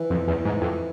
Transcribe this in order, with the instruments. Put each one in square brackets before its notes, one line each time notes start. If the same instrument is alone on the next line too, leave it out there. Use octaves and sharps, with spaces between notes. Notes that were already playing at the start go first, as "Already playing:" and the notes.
Already playing: [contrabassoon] E3
[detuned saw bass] F2
E2
G#2
F2